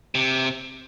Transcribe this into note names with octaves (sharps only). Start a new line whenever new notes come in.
C3